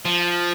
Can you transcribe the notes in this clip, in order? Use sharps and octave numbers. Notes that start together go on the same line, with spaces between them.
F3